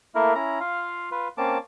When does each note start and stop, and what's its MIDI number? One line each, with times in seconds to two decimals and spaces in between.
0.15 0.34 57
0.15 0.34 58
0.15 0.34 64
0.15 0.34 70
0.35 0.59 61
0.35 0.59 64
0.35 0.59 82
0.60 1.10 65
0.60 1.10 77
1.12 1.28 65
1.12 1.28 71
1.38 1.58 58
1.38 1.58 60
1.38 1.58 61
1.38 1.58 81
1.38 1.58 86